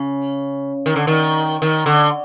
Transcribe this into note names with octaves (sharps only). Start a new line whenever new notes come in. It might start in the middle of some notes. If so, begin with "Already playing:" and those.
Already playing: C#3
D#3
D3
D#3
D#3
D3